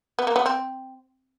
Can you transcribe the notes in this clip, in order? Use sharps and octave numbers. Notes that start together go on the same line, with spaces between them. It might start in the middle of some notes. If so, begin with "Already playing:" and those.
B3
A#3
B3
C4